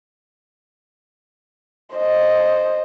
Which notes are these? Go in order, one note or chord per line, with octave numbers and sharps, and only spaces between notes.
C5 D#5